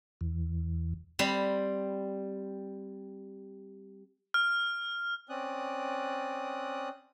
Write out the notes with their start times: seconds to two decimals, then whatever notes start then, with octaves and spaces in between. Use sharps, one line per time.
0.21 E2
1.19 G3 C4 B5
4.34 F6
5.29 C4 C#4 D5 D#6 F#6